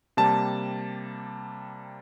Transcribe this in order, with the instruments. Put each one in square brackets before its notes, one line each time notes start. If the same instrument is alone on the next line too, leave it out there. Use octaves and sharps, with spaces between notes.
[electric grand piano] C3 G3 A#3 A5